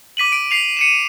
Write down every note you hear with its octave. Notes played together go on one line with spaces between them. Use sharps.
D6 B6 D#7 F#7
D7
B6 C7 F7
C#7 D#7 E7